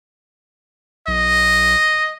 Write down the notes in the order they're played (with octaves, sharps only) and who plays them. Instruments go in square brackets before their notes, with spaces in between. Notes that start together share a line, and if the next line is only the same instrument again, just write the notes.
[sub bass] B1 [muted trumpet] D#5